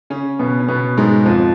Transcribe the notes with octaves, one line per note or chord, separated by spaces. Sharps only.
C#3 C#4
B2 B3
C#4
B2 B3
G#2 G#3
F2 F3